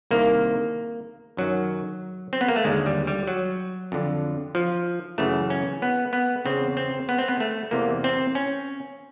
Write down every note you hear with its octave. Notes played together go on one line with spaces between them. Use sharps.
C2 C3 D#3 A#3
F#2 D#3 F#3
C4
B3
A#3
A3
D#2 D3 G#3
G3
G3
F#3
F2 D3
F3
F#2 C#3 E3 A3
C#4
B3
B3
E2 C#3 E3 C4
C4
B3
C4
B3
A3
E2 C3 E3 A#3
C4
C#4